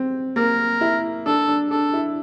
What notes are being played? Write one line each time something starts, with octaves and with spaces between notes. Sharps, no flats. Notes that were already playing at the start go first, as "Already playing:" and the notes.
Already playing: C4
A#3 A#4
E4
D4 A4
D4
D4 A4
E4